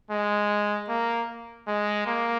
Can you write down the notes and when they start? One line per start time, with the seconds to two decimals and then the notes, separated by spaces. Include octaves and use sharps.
0.11 G#3
0.88 A#3
1.67 G#3
2.06 A#3